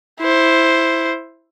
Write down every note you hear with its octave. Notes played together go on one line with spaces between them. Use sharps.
E4 C5